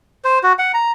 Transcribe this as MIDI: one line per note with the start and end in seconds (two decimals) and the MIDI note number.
0.25 0.39 72
0.43 0.53 66
0.59 0.72 78
0.74 0.92 82